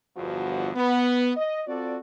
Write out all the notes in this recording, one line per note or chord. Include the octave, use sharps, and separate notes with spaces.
G1 E2 F3 F#4
B3
D#5
C4 F4 F#4 A4 D5